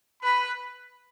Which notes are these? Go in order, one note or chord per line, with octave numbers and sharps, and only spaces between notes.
B4 B5